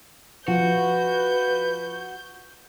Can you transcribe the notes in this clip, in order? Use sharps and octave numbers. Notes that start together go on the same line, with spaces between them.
F3 F#4 B4 G6